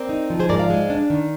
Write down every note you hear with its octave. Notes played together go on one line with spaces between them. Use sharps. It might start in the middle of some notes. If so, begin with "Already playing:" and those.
Already playing: C4 A#4 D5
D#4
F3
G#4 C5
G#2 A#4 D5
D5 F5
G#3
D4
D#3